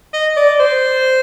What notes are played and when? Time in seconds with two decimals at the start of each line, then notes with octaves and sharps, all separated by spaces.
0.13 D#5
0.37 D5
0.60 C5